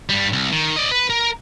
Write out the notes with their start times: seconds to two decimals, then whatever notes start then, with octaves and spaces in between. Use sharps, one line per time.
0.09 G2 G3
0.33 C2
0.52 D#3
0.76 D5 D#5
0.91 B4
1.10 A#4